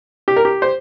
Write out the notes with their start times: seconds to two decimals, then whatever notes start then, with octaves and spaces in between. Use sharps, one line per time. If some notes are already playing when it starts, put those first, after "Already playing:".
0.28 G4
0.36 A#4
0.45 G4
0.62 C5